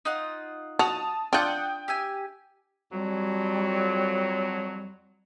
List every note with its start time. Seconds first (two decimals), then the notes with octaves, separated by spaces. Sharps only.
0.05 D#4 F4 F#5
0.79 F#4 A5 D#6 F7
1.33 D4 F4 D5 F#5 G5 D#6 G6
1.88 G4 E5 G#5
2.92 F2 F#3 G3